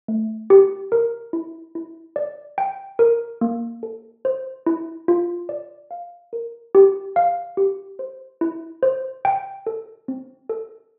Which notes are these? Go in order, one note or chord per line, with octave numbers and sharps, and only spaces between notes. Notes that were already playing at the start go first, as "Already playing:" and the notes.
A3
G4
A#4
E4
E4
D5
G5
A#4
A#3
A4
C5
E4
F4
D5
F5
A#4
G4
F5
G4
C5
E4
C5
G5
A4
C4
A4